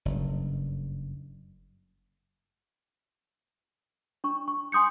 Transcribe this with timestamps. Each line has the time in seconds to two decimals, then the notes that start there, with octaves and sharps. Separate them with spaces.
0.05 F#1 G2
4.24 D4 C#6
4.48 C#6
4.72 G#5 C6 D#6 G6 C#7